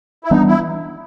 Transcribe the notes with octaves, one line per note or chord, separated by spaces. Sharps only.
E4
E3 G3 B3 D4 D#4
E4